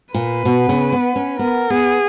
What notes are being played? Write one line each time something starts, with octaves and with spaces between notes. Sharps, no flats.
A#2 B4
B2
C#3
B3
C#4
B3 A#4
B3 G#4